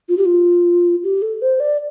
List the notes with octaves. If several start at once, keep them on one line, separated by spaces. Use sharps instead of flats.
F4
G4
F4
G4
A4
C5
D5